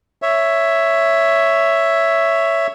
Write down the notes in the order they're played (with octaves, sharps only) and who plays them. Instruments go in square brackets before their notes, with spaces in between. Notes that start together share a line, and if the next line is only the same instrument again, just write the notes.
[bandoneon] C#5 E5